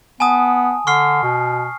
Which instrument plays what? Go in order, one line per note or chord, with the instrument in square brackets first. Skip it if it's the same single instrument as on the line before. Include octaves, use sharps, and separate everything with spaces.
[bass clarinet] B3 [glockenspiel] G#5 A5 D#6
[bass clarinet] D3 [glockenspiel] C#6 F6 C7
[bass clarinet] B2